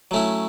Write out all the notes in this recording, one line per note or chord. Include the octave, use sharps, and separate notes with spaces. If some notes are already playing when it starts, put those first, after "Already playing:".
F#3 A3 C#4 E4